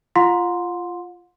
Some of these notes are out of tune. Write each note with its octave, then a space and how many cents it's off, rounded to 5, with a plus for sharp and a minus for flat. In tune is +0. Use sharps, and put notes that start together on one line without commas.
F4 -10 F#5 -45 C6 +0